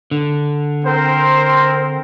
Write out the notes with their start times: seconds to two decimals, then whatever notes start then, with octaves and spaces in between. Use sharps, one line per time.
0.11 D3
0.84 C4 A#4 C5